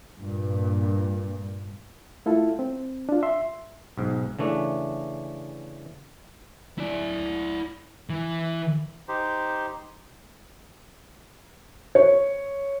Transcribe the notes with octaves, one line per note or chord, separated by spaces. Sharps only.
G2 A#2
A3 E4 F4 A4
C4
D4 F4
E5 C6
B1 G#2
C#3 E3 A3 D4
E4 D5
E3
D#4 G4 C5
C#5